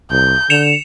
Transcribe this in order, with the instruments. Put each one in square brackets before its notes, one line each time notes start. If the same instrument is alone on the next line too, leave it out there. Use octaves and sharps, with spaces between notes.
[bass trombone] C2 [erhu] G6
[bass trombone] D3 [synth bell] C#7 E7 F7